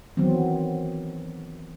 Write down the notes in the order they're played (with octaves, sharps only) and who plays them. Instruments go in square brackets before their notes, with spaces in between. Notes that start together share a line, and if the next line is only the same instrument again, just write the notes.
[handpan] D#3 E3 F#3 B3 C4